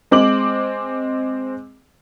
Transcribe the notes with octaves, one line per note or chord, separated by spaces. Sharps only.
G#3 C4 D6 F#7